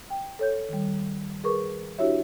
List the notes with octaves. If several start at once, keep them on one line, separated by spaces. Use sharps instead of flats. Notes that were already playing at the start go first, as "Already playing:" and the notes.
G5
A4 C#5 G6
D#3 G3
G#4 A#4 B4 C#6 D6
D4 E4 F#4 G4 C#5 E5